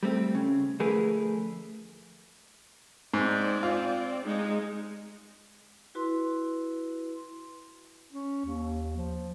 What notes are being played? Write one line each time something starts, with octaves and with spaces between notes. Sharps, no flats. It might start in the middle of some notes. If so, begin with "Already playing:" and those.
G3 A3 C4
C#3
D2 F3 A3 G#4 A#4 B4
G#2 C4 D5
F4
G#3 D#4 G#4
E4 F#4 B4 C6
C#4
D#2
F3